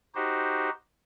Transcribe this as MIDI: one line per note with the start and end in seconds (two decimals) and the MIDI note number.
0.15 0.70 63
0.15 0.70 66
0.15 0.70 67
0.15 0.70 72